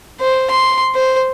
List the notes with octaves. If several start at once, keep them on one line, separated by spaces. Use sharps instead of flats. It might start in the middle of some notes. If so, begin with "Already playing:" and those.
C5
C6
C5